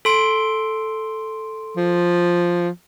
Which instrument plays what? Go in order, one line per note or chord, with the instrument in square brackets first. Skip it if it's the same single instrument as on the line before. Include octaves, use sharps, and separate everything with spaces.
[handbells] A4 C6 D7
[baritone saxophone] F3